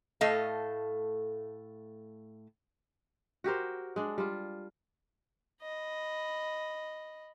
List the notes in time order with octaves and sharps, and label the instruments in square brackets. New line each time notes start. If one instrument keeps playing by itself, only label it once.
[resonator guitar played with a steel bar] A2 A3 A4 D#5 F5
[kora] F#4 G4 A#4 C5
G#3 D4
G3 F4
[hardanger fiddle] D#5 B5